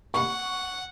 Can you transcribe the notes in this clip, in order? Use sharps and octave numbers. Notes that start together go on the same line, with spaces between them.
F#5 C#6